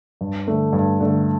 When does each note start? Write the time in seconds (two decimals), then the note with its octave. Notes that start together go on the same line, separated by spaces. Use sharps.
0.21 G2
0.47 D3 A3
0.73 G2
1.00 D3 A3